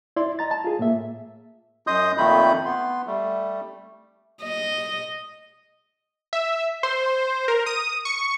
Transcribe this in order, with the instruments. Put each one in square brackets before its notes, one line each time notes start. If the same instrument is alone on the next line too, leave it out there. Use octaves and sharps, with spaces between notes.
[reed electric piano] E4 D5 C6
D#5 A#5 A6
A5
F4 G#4
A2 A#3 E5
[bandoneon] F#2 D#5 C6 D#6 G6
F2 A#2 D#3 A3 B5 G6
B3 C6
G3 A3
[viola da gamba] D#5
[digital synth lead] E5
C5
A#4
D#6
C#6